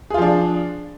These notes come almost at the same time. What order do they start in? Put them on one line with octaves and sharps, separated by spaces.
G#4 F4 F3 D4